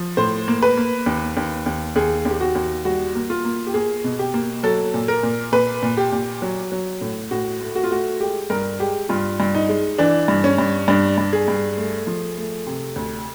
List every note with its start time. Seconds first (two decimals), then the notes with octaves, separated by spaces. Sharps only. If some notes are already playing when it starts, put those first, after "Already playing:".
Already playing: F3
0.17 A2 C5
0.48 A#3
0.62 B4
0.77 A#3
1.06 D#2
1.37 D#2
1.66 D#2
1.96 D#2 G#4
2.25 D#2
2.31 G4
2.41 F#4
2.55 D#2
2.85 G3 F#4
3.15 A#3
3.30 F4
3.45 A#3
3.67 G4
3.74 A#3 G#4
4.04 B2
4.19 G4
4.34 A#3
4.63 F#3 A4
4.94 A#2
5.08 A#4
5.23 A#2
5.52 A#2 B4
5.83 A#2
5.97 G4
6.12 A#2
6.42 F#3
6.72 F#3
7.01 A2
7.31 A2 F#4
7.61 A3
7.75 F#4
7.84 F4
7.91 A3 F#4
8.20 G#3 G4
8.50 G2 A#4
8.80 G#3 G4
9.09 G2 F4
9.40 G2
9.55 D#4
9.69 G#3
9.98 E3 D4
10.28 G2
10.44 C#4
10.58 G2
10.88 G2 D4
11.18 G2
11.33 G#4
11.48 G2
11.77 A3
12.07 F3
12.37 A3
12.67 C3
12.96 D2